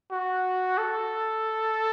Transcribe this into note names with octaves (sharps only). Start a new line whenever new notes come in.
F#4
A4